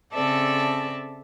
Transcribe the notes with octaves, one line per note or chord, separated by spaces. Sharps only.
C#3 C4 A4 D5 E5 A5